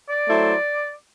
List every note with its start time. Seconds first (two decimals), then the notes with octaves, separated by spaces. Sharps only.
0.09 D5
0.28 F#3 A3 E4 A4 C5